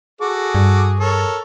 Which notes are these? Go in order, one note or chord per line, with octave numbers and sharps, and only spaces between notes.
F#4 G#4 A4 D6
G2
A4 A#4 C#5